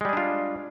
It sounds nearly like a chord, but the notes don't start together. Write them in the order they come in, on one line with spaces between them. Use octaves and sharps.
G#3 G3 G#4 D4 F4